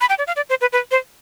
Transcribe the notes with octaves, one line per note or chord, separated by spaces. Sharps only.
B5
G5
D5
F5
D5
C5
B4
B4
C5